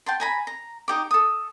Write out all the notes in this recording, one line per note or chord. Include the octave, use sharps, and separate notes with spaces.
G5 A5 C6
G#5 A#5 B5
A#5
D#4 G4 D6
A4 D#6